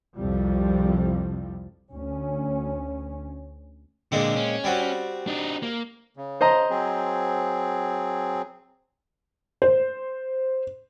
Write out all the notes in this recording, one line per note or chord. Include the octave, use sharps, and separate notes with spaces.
C2 F2 C3 F3 G3
D2 C#4
A#2 D3 G#3 C4
C#4
G3 C4 F#4
D4 D#4
A#3
C#3
C5 D#5 A#5
F#3 C4 G#4
C5